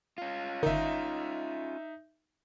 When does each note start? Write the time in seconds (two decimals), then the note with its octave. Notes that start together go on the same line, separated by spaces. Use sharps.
0.18 C#4 F4
0.63 G1 D#3 D#4 E5